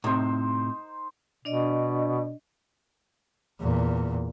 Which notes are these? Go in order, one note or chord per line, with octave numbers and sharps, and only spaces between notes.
A2 C3 D#4 C5
B2 D4 D5 D#5
E2 A#2